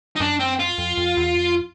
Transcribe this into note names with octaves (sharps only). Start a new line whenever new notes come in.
D#4
F#2 D4
C4
F4
F2
F2
E2
F2